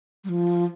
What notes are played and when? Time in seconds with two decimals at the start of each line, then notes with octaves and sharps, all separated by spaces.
0.24 G3
0.29 F3